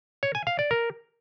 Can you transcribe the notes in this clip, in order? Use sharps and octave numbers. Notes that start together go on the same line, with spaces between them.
C#5
G#5
F5
D5
A#4